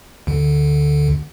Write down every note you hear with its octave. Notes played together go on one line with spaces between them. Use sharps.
D2 D3